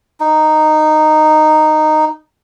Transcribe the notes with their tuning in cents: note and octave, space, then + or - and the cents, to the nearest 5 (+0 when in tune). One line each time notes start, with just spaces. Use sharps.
D#4 -10